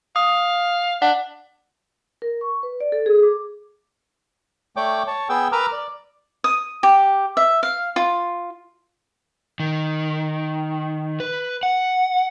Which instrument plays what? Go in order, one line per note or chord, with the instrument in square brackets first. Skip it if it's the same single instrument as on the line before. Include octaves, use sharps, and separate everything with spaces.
[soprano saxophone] F5 [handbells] D#6
[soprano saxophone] D4 [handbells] F#5
[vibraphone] A#4
C#6
B4
D5
A4
G#4
D6
[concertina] A3 C#5 D5 G5 D6
C#5 A5
B3 G#4 G5 E6
A#4 B4 A#5 D6 E6 F6
D5
[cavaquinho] D#6
G4
E5
F5
F4
[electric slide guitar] D#3
B4
F#5